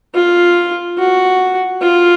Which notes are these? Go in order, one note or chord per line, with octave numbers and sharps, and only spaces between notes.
F4
F#4
F4